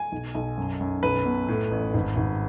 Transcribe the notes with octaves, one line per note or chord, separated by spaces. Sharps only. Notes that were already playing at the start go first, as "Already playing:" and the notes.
Already playing: G#5
B1
B1
F#2
F#2
B1 B4
B2
A2
A1
G#1
G#1